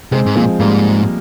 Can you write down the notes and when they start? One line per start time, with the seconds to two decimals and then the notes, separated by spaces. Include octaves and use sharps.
0.12 C3 G#3 C4
0.26 G#2
0.36 A#2 F3 G#3
0.60 G#2 G3 A#3